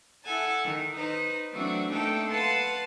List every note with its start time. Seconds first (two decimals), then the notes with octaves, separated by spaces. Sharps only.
0.24 E4 A4 F#5 G#5 A5
0.65 D#3
0.97 D#4 B4 C5
1.54 E3 F#3 A3 C4 D4 F#4
1.91 A3 A#3 D4 D#4 A4 G5
2.29 B4 F5 F#5 A5 C6